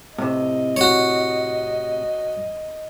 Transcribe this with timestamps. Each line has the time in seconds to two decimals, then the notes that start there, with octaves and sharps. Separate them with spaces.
0.18 A2 C3 D#5
0.77 F#4 C#5